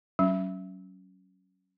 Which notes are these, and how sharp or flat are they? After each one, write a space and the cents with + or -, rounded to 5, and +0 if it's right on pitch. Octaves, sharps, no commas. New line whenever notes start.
F#3 +25 C#4 +0